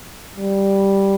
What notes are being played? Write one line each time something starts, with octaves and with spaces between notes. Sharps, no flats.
G3